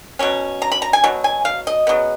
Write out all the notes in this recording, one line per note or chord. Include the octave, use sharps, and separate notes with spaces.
B2 F#3 C#4
A#5
B5
A#5
G#5
B2 F#3
G#5
F5
D#5
C#3 F#3 B3